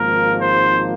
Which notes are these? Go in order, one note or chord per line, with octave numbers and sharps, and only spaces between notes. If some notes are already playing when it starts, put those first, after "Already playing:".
Already playing: G#1 G#2 F3 A#3 A#4
C5